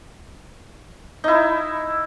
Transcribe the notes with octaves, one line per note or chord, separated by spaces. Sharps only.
D#4 E4